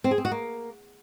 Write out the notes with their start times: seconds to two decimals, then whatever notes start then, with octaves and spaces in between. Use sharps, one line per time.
0.04 C4
0.11 G#4
0.18 C4
0.25 F#4
0.31 A#3